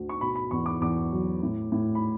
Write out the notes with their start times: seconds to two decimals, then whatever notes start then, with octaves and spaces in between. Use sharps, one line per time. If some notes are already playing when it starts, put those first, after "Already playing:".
Already playing: D2
0.09 C#6
0.21 B2 B5
0.36 B5
0.51 E2 C#6
0.66 D6
0.81 E2 D6
1.12 F#3
1.43 A2
1.72 A2
1.95 B5